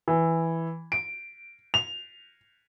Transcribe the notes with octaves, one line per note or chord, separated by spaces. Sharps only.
E3
D7
F7